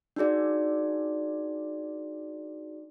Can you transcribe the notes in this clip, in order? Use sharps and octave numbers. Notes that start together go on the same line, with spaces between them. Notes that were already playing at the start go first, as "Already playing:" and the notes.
D4 D#4 F#4 G#4 D5